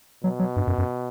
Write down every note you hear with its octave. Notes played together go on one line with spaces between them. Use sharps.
B2 F#3
F#3
G2
F#2
F#2